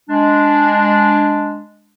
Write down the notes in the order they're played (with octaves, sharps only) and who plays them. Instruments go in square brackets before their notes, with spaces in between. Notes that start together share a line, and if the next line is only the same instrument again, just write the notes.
[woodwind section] G#3 D4